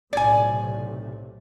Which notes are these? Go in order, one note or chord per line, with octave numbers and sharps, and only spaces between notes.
B1 A2 C3 D5 G#5